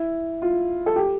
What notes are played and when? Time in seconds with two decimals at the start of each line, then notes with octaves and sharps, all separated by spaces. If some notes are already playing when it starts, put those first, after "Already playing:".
Already playing: E4
0.42 F4
0.86 A4
0.96 G4